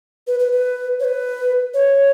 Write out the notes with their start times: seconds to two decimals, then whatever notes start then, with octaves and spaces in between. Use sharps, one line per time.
0.27 B4
0.39 B4
0.52 B4
1.00 C#5
1.04 B4
1.74 C#5